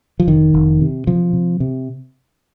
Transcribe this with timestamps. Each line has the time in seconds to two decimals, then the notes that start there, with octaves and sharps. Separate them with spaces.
0.20 F3
0.27 F1 D#3
0.54 F1
0.81 C3
1.07 C3 F3
1.33 C3
1.60 C3